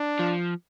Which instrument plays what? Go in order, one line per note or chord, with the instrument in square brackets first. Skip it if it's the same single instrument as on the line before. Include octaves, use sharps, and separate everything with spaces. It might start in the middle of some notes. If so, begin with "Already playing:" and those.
Already playing: [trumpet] D4
[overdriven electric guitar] F3